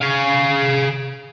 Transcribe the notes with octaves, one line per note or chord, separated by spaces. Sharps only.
G#4 F5